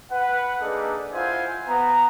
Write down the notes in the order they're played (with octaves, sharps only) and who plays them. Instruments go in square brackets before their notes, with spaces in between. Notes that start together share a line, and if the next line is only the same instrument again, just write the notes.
[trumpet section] B4 F#5
A#3 D4 D#4 G#4 A4
E4 F4 C5 F#5 G#5
B3 A#5